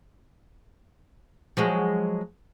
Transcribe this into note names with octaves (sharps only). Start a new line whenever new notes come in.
F3 F#3 G#3